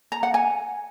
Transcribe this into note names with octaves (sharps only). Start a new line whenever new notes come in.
A#5
F#5
G#5